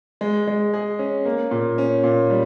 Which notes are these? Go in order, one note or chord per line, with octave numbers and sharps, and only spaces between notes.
G#3
G#3
G#4
C#4
A#3
A#2
C#4
A#2
G3